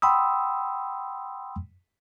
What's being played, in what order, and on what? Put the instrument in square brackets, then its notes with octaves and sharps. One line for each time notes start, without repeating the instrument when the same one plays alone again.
[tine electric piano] F#5 G5 B5 C6 D#6 E6